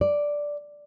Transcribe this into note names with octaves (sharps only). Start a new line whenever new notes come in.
D5